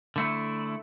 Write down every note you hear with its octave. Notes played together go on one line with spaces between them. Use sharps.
D3 A3 E4